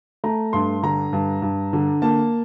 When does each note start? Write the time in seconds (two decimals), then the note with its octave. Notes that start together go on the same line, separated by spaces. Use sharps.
0.24 A3 A#5
0.53 G2 C6
0.83 D3 A#5
1.13 G2
1.42 G2
1.73 D3
2.02 A#3 A5